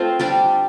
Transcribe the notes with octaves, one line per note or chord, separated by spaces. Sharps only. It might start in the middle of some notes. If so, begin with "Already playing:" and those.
Already playing: A3 C4 F4 C5
G3 D4 G4 D5